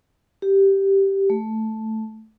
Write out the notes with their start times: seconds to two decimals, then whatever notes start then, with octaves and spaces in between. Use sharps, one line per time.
0.42 G4
1.30 A3